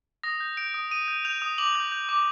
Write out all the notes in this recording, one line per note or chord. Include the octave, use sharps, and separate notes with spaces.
D#6 A#6
G6
G6 D7
D#6
D#6 D#7
G6
G6 F7
D#6
D6 F#7
G6
G6
D6